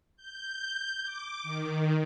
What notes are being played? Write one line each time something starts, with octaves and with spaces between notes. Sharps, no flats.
G6
D6
D#3